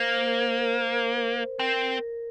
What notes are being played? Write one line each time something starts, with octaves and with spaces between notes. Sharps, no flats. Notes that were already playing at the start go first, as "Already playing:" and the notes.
Already playing: A#3 C5
C5
A#4
C4 A#4